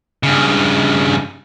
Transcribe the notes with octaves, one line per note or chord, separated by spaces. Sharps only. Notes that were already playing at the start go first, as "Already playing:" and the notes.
G2 C#3